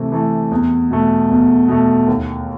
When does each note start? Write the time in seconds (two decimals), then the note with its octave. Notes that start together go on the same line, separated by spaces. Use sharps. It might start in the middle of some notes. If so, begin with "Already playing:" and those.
Already playing: C3 E3 A3
0.12 E3 A3
0.51 E2
0.91 B2 A3
1.30 E2
1.68 B2 A3
2.07 D#2